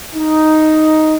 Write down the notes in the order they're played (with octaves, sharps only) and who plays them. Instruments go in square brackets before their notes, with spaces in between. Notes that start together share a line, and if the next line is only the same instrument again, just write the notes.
[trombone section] D#4